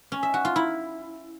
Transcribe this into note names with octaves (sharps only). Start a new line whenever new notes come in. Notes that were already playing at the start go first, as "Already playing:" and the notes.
C#4
E5
F#4
F4
E4